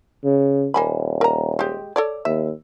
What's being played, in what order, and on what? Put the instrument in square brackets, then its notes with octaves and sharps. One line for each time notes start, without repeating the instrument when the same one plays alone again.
[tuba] C#3
[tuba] D#1 [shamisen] A#3 G#5 B5
[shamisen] A#4 A#5
G#3 G4
A4 C#5 D5
[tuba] D#2 [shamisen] E5